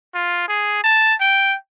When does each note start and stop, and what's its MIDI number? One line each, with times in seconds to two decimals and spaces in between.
0.14 0.47 65
0.48 0.79 68
0.84 1.14 81
1.20 1.55 79